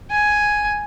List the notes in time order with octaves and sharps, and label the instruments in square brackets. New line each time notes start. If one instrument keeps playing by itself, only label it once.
[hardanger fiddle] G#5